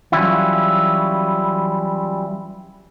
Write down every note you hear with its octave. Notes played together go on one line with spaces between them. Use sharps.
E3 F#3 G3 C#4 E4 F4